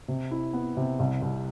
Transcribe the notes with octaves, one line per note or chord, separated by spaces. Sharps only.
C3
E4
B3
C3
C2
C2